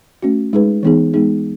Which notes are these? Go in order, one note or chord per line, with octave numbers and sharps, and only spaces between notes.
A3 C#4 F#4
G#3 D#4 G#4 B4
E3 B3 D#4 G#4
G#3 B3 D#4 G#4